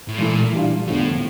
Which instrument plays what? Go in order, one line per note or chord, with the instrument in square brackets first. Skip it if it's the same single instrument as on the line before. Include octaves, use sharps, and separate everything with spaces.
[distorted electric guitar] A2
[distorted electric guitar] A#2 [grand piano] E3 A3 E4
[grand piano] E3 G3 D4 F4
[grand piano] E2 D3 F3 [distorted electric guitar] A2